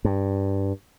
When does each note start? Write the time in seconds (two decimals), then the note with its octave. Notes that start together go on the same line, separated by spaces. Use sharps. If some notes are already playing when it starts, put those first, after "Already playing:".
0.05 G2